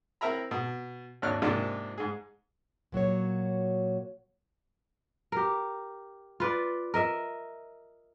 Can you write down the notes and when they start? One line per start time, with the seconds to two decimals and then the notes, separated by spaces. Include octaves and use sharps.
0.21 C4 E4 A#4 E5 A#5 B5
0.51 B2
1.22 G#1 D#2 D4 C#5 F6 F#6
1.42 G#2 C3 F3 A#3 D4 F4
1.98 G#2 G#4
2.92 A#2 F#3 F#4 C#5
5.32 G4 A#4
6.40 F4 B4 D5
6.94 A#4 D#5 E5